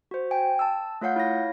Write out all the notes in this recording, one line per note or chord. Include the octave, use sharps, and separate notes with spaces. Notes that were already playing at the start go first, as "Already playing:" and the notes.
F#4 C5
G5 G#5
A5 E6
A3 F4 C#5 F5 F#5 G6
E4 C#5 F5 A#6